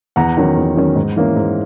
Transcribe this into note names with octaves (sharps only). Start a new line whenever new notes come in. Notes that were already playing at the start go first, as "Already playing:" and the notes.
E2 F#5 A#5
D#3 F#3 C#4
E2
D#3 F#3 C#4
G#2
E3 A#3 C#4
G#2